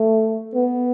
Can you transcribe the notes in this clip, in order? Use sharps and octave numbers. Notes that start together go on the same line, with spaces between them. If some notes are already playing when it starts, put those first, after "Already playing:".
Already playing: A3
B3